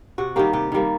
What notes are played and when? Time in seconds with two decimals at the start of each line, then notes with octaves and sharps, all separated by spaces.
0.18 C3 F#4
0.36 D#3 G3 A#3 G4
0.53 C3 G4
0.72 D#3 G3 A#3